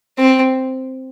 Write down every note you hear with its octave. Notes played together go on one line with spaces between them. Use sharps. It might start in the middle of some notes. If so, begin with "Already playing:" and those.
C4